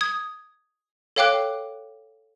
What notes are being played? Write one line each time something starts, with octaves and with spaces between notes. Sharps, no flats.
D#6 G#6
A4 C#5 F5 G5 D6 F#6